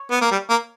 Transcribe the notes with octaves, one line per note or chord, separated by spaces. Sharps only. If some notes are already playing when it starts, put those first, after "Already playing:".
Already playing: C#5
B3
A#3
G3
A#3